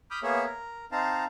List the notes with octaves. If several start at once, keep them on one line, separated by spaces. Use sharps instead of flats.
B5 D6 D#6 F6 G6
A#3 B3 G#4 C#5 E5
A#4
C4 D#4 F5 A5 A#5